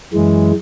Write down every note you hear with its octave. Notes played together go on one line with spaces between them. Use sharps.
F#2 E3 G#3